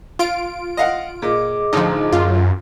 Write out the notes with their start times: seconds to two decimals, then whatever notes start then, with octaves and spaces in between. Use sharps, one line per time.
0.19 F4 F5 D7
0.77 D#5 F5 F#5
1.22 A#2 G#4 D#5 D6
1.73 A1 D2 F3 D#4
2.13 F#2 F4